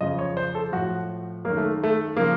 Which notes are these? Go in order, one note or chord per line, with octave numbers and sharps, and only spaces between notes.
F2 C#3 F3 D#5
C#5
C5
A4
A2 F3 F#4
F#2 D#3 A#3
A3
A3
C#3 F3 A#3